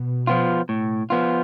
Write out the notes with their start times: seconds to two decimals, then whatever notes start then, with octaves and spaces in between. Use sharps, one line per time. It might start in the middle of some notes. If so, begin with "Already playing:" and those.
Already playing: B2
0.27 F3 B3 F4
0.69 A2
1.10 F3 B3 F4